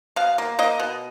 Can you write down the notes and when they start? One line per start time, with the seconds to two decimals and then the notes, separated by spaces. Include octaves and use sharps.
0.16 B2 F5
0.38 A#3
0.59 A#3 D#5
0.80 B2